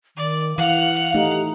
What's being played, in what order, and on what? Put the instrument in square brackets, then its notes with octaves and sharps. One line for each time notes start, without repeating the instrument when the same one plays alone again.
[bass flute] D#3 [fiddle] D5
[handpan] E3 [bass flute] F5 [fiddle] F#5 F6
[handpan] A3 D#4 [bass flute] G4